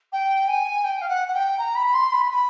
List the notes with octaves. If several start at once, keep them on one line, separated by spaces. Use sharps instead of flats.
G5
G#5
G5
F5
F#5
F#5
G5
A#5
B5
C6
B5
B5